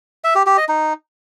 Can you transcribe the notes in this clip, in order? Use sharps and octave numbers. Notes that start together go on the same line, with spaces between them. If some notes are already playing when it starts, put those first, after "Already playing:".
E5
G4
G4
D#5
D#4